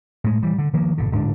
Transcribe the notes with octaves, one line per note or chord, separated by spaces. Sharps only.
A2 G#3
E3 G3
D3
D#3 F3 A#3
G#1 B2 D3
D1 G#2 D3 D4